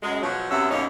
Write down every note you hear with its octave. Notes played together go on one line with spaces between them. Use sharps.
F#2 G#3
B2 F3 F#3
F#2 C3 B3 C#4 E5
F#2 B2 A#3 C#4 D#4